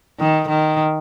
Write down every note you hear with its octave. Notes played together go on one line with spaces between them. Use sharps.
D#3
D#3